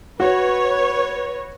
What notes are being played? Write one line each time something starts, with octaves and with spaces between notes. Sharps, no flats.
F#4 B4 C#5